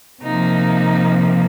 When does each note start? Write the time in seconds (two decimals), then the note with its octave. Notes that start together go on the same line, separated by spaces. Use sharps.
0.23 C3 F3 A#3 D#4